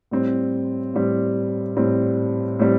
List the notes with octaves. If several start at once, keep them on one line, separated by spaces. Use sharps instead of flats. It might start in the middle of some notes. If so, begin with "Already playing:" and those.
A2 G3 C4
A2 G3 C4
A2 G3 C4
A2 G3 C4